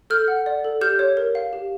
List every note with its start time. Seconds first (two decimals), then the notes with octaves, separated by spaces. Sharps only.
0.10 A4 F6 G6
0.28 F#5
0.46 D5
0.65 A4
0.81 G4 F6 G6
0.99 C#5
1.17 A#4
1.35 F5
1.53 G4